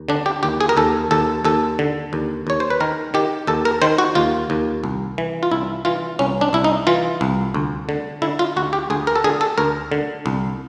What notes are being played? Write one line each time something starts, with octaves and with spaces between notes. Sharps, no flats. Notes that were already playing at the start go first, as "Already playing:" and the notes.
Already playing: D#2
D3 D4
G4
D#2 G4
G#4
A#4
D#2 A4
D#2 A4
D#2 A4
D3
D#2
D#2 C#5
C5
B4
D#3 A#4
D#3 G4
D#2 A4
A#4
D#3 C5
F#4
D#2 F4
D#2
C2
E3
F4
C2 E4
E3 F4
C2 C#4
D4
C2 E4
D#4
E3 F4
C2
D2
D3
D3 E4
F4
D2 F#4
G4
D2 G#4
A#4
A4
D3 G#4
A4
D2 A#4
D3
C2